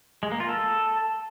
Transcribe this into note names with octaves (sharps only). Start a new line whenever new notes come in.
G#3
A#3
F4
A4